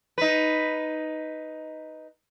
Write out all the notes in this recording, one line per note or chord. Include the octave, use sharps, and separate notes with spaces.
D#4 B4